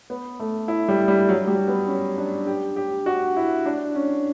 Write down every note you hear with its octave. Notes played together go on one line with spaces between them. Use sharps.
B3
A3
E4
G3
G3
F#3
G3
B3
C#4
D4
G4
G4
F#4
E4
D4
C#4